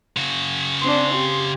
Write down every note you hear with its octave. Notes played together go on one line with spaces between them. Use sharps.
C#3 F#4
C4 D4 C6
G4